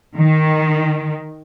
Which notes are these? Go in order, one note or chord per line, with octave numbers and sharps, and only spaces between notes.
D#3